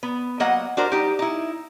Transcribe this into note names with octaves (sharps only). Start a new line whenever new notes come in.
B3
F#3 A#3 D#5 F#5
D4 F#4 A#4 C5
G3 D#4 G4
D#4 E4